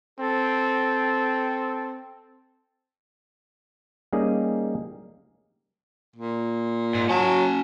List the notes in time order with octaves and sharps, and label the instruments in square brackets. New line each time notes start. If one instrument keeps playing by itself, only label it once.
[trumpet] C4 [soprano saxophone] A4
[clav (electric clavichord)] G3 A#3 C#4 D#4 G#4 D#5
[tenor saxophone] A#2
[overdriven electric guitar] G#2
[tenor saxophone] F#3 [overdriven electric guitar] C#4 A5